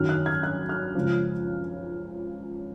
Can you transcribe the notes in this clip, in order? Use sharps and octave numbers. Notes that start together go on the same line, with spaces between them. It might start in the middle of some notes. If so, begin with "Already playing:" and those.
Already playing: F#2 D#3 F#3 F6
F#6
G#6
F#6
F6
C#2 C#3 F3